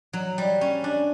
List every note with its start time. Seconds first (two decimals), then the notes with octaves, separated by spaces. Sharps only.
0.13 F#3
0.38 G3
0.61 C#4
0.84 D4